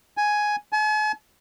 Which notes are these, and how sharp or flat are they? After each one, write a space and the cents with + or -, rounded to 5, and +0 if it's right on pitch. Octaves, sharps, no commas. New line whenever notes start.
G#5 +5
G#5 +45